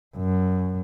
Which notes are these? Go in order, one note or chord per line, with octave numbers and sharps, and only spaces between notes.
F#2